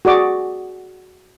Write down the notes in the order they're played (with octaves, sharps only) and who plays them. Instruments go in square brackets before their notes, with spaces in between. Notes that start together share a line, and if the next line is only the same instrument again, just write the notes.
[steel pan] F#4 G#4 D5 D6